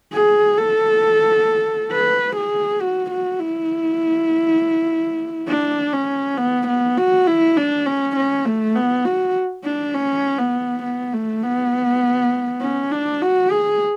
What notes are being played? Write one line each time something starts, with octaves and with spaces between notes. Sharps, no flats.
G#4
A4
B4
G#4
F#4
F#4
E4
D4
C#4
B3
B3
F#4
E4
D4
C#4
C#4
A3
B3
F#4
D4
C#4
B3
B3
A3
B3
C#4
D4
F#4
G#4